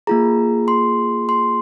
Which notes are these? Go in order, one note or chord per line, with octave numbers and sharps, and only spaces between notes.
A#3 F4 G#4 A#5
C6
C6